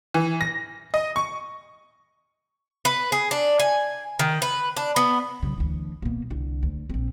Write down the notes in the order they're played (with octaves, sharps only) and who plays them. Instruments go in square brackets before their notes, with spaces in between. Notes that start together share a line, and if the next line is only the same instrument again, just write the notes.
[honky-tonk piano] E3
A#6
D#5
C#6
[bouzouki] B4
G#4
D4
G#5
D#3
B4
D4
B3
[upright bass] C#3 F#3
D2 E3
B2 A#3
C2 D3
D2
A#1 C4